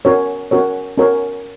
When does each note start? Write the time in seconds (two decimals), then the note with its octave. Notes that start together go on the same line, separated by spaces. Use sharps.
0.05 C#4 F#4 A#4 C#5
0.51 C#4 F#4 A#4 C#5
0.97 C#4 F#4 A#4 C#5